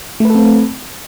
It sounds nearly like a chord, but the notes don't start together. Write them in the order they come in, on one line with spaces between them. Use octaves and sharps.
A3 B4 A4 C4